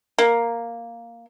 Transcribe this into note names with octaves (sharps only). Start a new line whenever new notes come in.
A#3